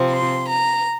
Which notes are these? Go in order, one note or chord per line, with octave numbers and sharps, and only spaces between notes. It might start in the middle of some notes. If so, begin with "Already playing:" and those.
Already playing: C3 F3 C4
C6
A#5